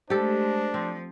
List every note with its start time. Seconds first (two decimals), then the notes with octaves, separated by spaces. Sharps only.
0.10 G#3 A3 D4 G4 A4 C5
0.74 F3 C4